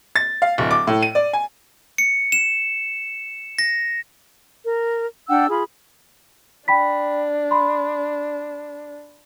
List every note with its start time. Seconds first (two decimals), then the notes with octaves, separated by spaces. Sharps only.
0.16 A6
0.42 F5
0.58 D1
0.71 D6
0.87 A2
1.03 D#7
1.15 D5
1.33 G#5
1.98 C#7
2.32 E7
3.59 A#6
4.65 A#4
5.29 D4 F#5 G5 E6
5.49 F4 G#4 B5
6.68 D4 G5 B5 B6
7.51 B5 C6